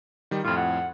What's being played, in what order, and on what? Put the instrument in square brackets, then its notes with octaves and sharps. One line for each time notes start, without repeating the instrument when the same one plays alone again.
[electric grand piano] D#3 G3
[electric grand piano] F2 A2 [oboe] F4
[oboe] F#5